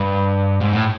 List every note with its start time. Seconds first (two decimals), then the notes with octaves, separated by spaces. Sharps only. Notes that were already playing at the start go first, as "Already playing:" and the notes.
Already playing: G2
0.61 G#2
0.73 A2